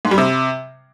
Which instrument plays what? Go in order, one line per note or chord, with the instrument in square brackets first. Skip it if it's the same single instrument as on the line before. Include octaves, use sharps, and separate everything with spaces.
[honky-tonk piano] G#2
G3
C3